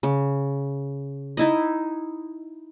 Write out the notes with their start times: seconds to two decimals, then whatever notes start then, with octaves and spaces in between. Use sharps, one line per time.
0.03 C#3
1.37 D#4 E4 D#5